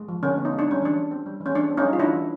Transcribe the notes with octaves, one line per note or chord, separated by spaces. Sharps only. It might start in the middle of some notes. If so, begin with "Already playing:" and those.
Already playing: G#3
F3
D3 C#4
B3
D#4
G#3
D4
G3 C#4
E3 D4
E3
C4
G3
E3
C#4
E3 D4
C4
C#4 D#4
G3
F4
E3 D4 E4
E3